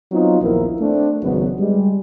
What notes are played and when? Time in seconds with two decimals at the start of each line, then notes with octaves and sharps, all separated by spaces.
0.11 F#3 B3 C4 D#4 F4
0.40 A#1 D#2 F3 B3 E4 A#4
0.81 A3 C4 D4
1.22 G#1 C#2 F#3 B3
1.59 G3 G#3